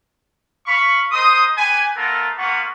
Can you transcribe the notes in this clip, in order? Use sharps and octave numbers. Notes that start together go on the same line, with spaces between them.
F5 B5 C#6
A#4 C5 D#5 C6 D#6
G4 B4 G#5
A3 B3 F4 A4 A#4
A#3 B3 F4 B4 F#5 C#6